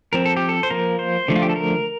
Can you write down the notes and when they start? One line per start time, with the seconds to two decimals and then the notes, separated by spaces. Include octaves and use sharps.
0.13 F3 C4 A#4
0.25 A4
0.37 G4
0.49 A4
0.63 C5
0.70 F3 A#3 A#4
0.99 C5
1.28 D3 F3 A3
1.36 F4
1.42 G4
1.49 A4
1.56 A#4